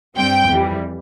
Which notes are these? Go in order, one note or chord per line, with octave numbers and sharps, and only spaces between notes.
G2 G3 C4 G5
F2 E3 G3